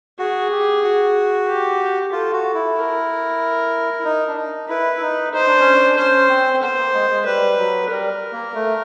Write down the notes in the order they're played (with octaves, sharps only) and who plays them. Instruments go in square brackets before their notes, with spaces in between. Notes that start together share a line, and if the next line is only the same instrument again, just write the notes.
[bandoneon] F#4 [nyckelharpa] G#4
[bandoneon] G4
F#4
[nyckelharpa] G4
[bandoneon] F4 [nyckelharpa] A4
[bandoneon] F#4
E4
[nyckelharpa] A#4
[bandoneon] E4
D#4
D4
D#4
[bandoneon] E4 [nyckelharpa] B4
[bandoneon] E4
D#4
[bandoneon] D#4 [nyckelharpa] C5
[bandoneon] D4
C#4
D4
[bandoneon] C#4 [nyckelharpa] C5
[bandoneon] C4
C4
[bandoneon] B3 [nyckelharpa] C5
[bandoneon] B3
A#3
G#3
G#3
[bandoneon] G3 [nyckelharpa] B4
[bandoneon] F#3
[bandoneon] G3 [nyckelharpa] A#4
[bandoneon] A#3
A3